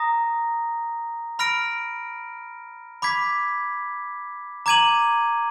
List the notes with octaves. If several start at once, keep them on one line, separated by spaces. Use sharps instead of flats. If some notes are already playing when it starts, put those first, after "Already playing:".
Already playing: A#5 D#6 A#6
B5 F6 A#6 D7
B5 D6 G#6 B6
A#5 D6 G#6 D#7 F#7